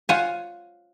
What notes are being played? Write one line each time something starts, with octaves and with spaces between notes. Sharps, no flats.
F4 C5 C#5 F#5 G#5